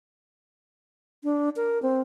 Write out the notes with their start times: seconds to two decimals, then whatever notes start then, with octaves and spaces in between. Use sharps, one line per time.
1.24 D4
1.56 A#4
1.82 C4